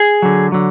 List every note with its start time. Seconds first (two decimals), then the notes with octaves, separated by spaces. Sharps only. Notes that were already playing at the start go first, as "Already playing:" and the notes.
Already playing: G#4
0.22 D3 F#3
0.52 D3 F#3